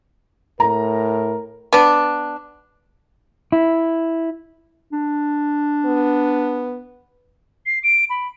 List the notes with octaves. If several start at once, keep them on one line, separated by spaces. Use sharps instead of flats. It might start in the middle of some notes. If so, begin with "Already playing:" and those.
A2 A#4 A#5
B3 D4
E4
D4
B3
C7
D7
B5